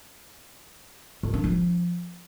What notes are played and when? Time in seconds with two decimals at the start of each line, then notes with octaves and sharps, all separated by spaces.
1.23 D#3
1.34 D4
1.44 F3